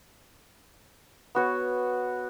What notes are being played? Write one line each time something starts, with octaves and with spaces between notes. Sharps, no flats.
B3 F#4 C#5